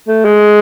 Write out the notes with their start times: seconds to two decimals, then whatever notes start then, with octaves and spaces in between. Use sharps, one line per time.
0.08 A3
0.25 G#3